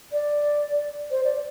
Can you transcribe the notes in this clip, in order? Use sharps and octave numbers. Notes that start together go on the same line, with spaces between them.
D5
C5
D5